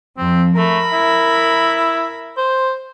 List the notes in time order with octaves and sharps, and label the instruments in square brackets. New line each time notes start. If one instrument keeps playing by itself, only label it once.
[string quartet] F2 [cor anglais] C4
[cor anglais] A3 [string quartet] A#4 B5
[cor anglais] E4
C5